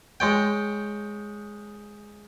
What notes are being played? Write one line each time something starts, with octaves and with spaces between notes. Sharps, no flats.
G#3 C#5 G5